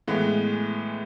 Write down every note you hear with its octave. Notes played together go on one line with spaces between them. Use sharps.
A2 E3 G#3 B3